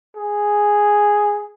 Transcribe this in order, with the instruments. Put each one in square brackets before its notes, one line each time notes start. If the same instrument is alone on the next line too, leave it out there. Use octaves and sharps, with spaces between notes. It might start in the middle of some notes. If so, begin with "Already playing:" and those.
[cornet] G#4